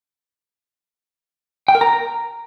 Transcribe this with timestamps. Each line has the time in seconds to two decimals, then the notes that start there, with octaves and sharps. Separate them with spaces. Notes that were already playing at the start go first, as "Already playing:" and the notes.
1.68 G5
1.75 A#4
1.81 A#5